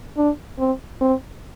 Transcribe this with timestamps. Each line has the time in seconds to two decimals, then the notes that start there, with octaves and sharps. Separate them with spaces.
0.17 D4
0.59 C4
1.01 C4